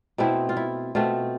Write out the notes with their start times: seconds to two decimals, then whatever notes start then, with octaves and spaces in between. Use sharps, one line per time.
0.18 B2 A3 C4 E4
0.49 F4
0.57 E4
0.95 B2 A3 C4 F4